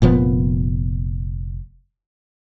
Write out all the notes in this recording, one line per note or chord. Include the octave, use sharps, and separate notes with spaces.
F1 A#2 F3 B3